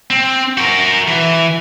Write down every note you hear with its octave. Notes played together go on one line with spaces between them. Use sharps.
C4
F#4 A#4
E3